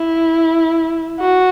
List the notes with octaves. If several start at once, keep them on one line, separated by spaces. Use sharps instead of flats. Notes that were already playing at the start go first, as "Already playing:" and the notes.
Already playing: E4
F#4